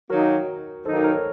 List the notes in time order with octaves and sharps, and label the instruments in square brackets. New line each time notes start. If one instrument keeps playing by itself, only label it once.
[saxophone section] D#3 F#3 A#3 D#4 [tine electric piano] F#4 A#4
[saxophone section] D#3 F#3 A#3 D#4 [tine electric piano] A4 C5
[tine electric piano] A#4 C#5